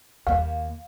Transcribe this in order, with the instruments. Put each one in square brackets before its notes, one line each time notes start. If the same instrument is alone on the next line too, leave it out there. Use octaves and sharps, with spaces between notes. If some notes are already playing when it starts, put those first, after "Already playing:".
[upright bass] D#2 A#3 [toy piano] F5